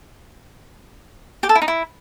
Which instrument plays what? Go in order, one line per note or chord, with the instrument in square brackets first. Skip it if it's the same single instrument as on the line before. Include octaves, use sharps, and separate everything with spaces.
[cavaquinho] G4
A4
E4
D#4
E4